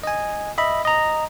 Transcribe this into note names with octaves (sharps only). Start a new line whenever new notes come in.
D#5 G#5
D#5 E5 B5
D#5 A#5